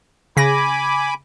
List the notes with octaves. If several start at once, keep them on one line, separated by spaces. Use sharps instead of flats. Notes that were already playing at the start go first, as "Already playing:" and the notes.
C#3 G#5 B5 D6 A#6